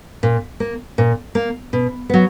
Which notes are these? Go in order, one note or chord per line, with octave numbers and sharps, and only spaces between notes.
A#2
A#3
A#2
A#3
B2
F#3 B3